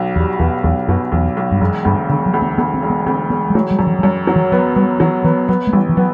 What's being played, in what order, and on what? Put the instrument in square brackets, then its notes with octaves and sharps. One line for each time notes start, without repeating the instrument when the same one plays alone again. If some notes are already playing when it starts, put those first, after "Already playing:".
Already playing: [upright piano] B1 B2
[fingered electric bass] E2 [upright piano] G3
[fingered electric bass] E2 [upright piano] B2
[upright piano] B1 [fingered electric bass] E2
[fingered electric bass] F#2 [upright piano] B2
[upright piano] B1 [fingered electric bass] E2
[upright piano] B1
[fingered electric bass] G2
[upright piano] E1 [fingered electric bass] F#2
[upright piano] D2 [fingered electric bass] G2
[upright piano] E1 [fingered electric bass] D3
[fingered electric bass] F#3
[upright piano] D2
[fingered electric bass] B3
[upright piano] D2 [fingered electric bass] B3
[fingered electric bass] C4
[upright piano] E1
[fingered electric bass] B3
[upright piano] D2 [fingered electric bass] C4
[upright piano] E1 [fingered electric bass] B3
[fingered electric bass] G3
[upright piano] F#3 [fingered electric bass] A3
[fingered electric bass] G3
[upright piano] F#2 [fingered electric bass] F#3
[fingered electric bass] E3
F#3
[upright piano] F#2 [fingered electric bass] G3
[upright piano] F#3
[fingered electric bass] E3
[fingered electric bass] F#3 [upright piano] B3
[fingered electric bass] G3 [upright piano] B3
[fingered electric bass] E3 [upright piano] F#3
[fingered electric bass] E3 [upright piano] B3
[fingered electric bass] F#3 [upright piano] B3
[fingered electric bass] A3
[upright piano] A1 [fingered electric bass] G3
[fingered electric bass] E3
[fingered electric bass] F#3 [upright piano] B3